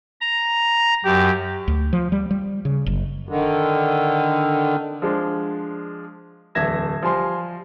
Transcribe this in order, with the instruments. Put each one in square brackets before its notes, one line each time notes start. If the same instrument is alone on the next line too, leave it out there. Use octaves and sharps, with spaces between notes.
[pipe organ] A#5
[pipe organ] F#2 [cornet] G4
[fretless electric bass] D2
F3
G3
G3
C#3
F#1
[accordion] D3 D#3
[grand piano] F3 G#3 D4
D1 E2 E5 G#6 A#6 E7
F3 G3 G#5 C6